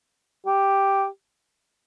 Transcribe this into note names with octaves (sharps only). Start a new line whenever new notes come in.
G4